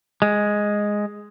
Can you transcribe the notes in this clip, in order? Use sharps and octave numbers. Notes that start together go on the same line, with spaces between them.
G#3